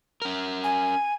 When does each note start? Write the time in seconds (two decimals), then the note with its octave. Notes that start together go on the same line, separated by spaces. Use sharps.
0.22 C#4 A#4
0.64 G#5